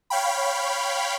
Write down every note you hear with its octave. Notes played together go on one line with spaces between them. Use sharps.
C#5 F5 G5 B5